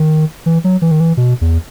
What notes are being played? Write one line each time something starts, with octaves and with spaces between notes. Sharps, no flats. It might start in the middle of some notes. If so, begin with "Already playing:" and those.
Already playing: D#3
E3
F#3
E3
D#3
E3
B2
E2